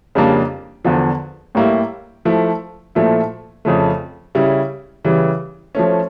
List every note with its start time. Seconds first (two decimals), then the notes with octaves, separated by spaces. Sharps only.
0.15 F2 C#3 G3 A#3 D4
0.85 E2 D3 F3
1.55 A2 G3 A#3 E4
2.25 F3 A3 E4
2.95 A#2 F3 A3 E4
3.65 F2 C#3 F3 A3
4.35 C#3 G3 C#4 E4
5.05 C#3 E3 G3
5.75 F3 A3 C#4